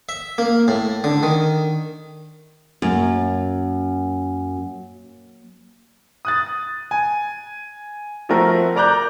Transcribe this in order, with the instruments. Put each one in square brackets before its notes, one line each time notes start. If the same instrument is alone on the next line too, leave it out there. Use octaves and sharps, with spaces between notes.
[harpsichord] E5
A#3
A2
D3
D#3
[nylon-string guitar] F#2 [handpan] F#3 A#3
[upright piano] D#6 F#6 A6
G#5
F3 A3 C4 F#4 A#4
A#4 D5 A#5 D6 F#6 G6